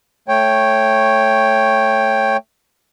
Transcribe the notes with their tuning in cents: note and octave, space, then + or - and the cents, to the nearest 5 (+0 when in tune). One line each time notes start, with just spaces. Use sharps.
A3 +0 C#5 -10 G5 +0